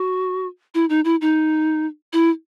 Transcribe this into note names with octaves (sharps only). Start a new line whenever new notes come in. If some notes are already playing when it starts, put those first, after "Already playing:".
Already playing: F#4
E4
D#4
E4
D#4
E4